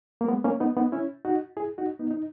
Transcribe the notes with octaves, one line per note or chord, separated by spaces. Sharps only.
A#3
G#3 B3
A#3 C#4
B3 D#4
B3 D#4
C#4 E4
D#4 F#4
E4 G#4
D#4 F#4
B3 D#4
D#4